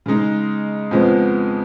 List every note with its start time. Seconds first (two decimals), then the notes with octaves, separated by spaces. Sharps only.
0.06 C#3 G#3 D#4
0.91 F2 C#3 F3 G#3 B3